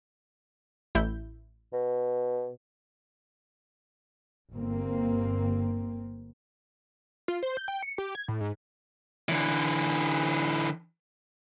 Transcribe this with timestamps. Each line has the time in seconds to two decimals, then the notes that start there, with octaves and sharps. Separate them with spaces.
0.95 A1 E4 G6
1.73 B2
4.52 G1 A#3 C4
7.28 F4
7.43 C5
7.57 G6
7.68 G5
7.83 C#7
7.98 G4
8.15 G#6
8.28 A2
8.41 G#2
9.29 D3 E3